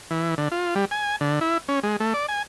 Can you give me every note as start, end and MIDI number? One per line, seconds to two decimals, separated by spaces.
0.11 0.35 52
0.38 0.49 50
0.52 0.75 65
0.75 0.85 55
0.91 1.16 80
1.21 1.39 50
1.41 1.58 64
1.69 1.80 61
1.83 1.96 56
2.00 2.14 57
2.14 2.26 74
2.29 2.43 80